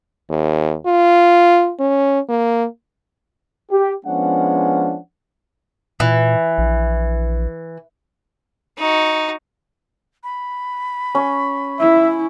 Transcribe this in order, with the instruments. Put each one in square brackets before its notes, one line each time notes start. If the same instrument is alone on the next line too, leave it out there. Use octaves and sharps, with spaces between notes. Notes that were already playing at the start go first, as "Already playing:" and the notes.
[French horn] D#2
F4
C#4
A#3
[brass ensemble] G4
F3 G#3 B3 C#4 D4 F#5
[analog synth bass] A#2 [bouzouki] E3
[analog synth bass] A#1
[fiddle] D#4 F#4
[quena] B5
[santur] C#4
[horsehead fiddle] E4 [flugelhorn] E5